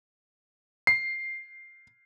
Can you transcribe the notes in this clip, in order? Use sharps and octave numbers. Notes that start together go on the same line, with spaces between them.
C7